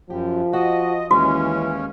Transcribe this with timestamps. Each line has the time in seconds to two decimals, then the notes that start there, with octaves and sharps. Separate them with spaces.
0.10 F#2 F3 G4
0.53 F#4 D#5
1.11 D#2 E3 G#3 C#4 F#4